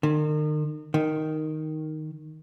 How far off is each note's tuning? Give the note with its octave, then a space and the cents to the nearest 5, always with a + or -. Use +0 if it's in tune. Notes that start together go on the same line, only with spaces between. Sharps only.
D#3 -40
D#3 +0